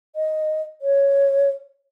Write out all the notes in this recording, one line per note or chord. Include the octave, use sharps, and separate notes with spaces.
D#5
C#5